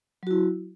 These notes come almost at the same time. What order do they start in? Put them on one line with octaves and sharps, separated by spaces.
F#3 F#4 E4